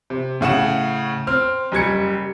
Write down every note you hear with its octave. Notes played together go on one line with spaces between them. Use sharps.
C3
A2 C#3 F#5 E7
C4 F6
F#1 G3 G#6 C#7